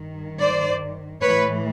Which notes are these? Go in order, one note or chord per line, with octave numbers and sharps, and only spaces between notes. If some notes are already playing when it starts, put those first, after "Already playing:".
Already playing: G2 D#3
C5 D5
A2 E3 B4 C#5